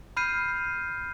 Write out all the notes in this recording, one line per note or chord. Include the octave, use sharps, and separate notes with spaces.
B5 F6 G6 C7 D#7